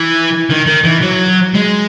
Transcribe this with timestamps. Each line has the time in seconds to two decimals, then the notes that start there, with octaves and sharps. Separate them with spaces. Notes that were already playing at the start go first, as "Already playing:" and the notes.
Already playing: E3
0.50 D#3
0.67 D#3
0.85 E3
1.02 F#3
1.55 G#3